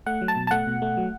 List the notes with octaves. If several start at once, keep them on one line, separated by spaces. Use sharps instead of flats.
A3 F#5
F#3
A5
B2
A5
A3 F#5
B2
A3
F#3